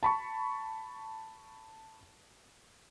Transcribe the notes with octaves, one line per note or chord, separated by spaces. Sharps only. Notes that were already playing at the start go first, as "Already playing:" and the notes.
A5 B5 C#6